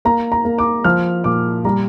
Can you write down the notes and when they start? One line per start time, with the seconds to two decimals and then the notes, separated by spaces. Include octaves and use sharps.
0.05 A#3 A#5
0.32 A#5
0.45 A#3
0.58 D6
0.84 F3 F6
1.24 A#2 D6
1.65 G3 A#5